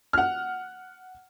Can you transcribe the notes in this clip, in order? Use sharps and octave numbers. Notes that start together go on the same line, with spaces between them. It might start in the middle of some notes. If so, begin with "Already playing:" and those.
F#5 F6